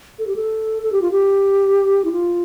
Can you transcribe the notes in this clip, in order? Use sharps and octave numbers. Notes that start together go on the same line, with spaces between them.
A4
G4
A4
A4
G4
F4
G4
E4
F4